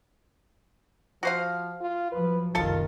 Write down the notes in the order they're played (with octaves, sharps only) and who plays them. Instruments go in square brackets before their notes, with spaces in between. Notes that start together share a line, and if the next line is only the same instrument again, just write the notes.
[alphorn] F3 [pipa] F#4 C5 F5
[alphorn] F4
[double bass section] F3 F#3 [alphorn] B4
[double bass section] F#1 C2 D#3 [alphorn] F4 [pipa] A4 A5